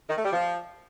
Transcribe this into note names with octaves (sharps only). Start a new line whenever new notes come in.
D#3
A3
G3
F3